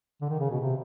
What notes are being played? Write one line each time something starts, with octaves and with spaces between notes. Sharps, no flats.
D3
D#3
C#3
B2
C3